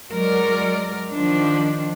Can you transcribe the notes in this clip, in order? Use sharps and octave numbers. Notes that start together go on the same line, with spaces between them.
F#3 G#3 A#4 D5
D#3 F3 D4